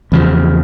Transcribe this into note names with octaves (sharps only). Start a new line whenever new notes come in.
E2 C#3 F3